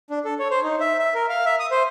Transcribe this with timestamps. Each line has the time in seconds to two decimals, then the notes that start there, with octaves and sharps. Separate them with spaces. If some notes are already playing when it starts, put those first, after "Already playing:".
0.10 D4
0.25 A4
0.39 C#5
0.51 C5
0.63 D#4
0.80 E5
0.99 E5
1.14 A#4
1.29 F5
1.46 E5
1.59 D#6
1.71 C5